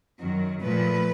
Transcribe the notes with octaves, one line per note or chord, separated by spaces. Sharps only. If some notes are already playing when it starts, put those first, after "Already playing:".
F#2 D#3 F#3
A#2 F3 A3 B4